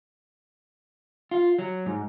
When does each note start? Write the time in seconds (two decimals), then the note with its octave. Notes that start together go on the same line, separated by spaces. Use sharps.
1.31 F4
1.59 F#3
1.86 G#2